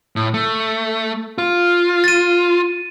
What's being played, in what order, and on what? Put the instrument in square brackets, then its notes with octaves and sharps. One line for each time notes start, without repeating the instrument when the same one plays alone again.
[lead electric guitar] A2
A3
F4
[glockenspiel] A6 D#7